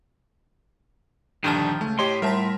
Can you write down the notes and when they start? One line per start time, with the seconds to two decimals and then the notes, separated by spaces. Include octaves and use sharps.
1.44 A#1 G2 D3 D#3 F3 A5 F6 G6
1.81 C#2 A3
1.99 A2 G4 C#5 D#5 C6
2.22 G3 A#4 E5 A5 B6